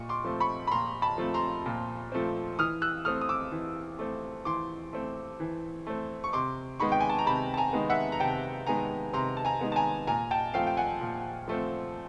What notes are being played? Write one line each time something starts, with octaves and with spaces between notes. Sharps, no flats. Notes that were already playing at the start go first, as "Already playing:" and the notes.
Already playing: A#2 C#6
C6 D6
F3 A3 C4
B5 C#6
B5
A#2 A#5 C6
A5 B5
F3 A3 C4
A#5 C6
A#2
F3 A3 C4
E3 D#6 F6
E6 F#6
A3 C4 D#6 F6
D#6
D6 E6
E3
A3 C4
E3 C6 D6
A3 C4
E3
A3 C4
C#6
C3 C6 D6
D#3 G#3 B3 B5 C#6
G5
G#5
A5
A#5
C3 A5 B5
A5
G#5 A#5
D#3 G#3 B3
E5 F#5
A#5
C3 G5 A5
D#3 G#3 B3 G#5 A#5
C3 A#5 C6
A5
G#5 A#5
D#3 G#3 B3
A5
G#5 A#5
A#2 G#5 A#5
G5 A5
F3 A3 C4 F5 G5
G5
F#5 G#5
A#2
F3 A3 C4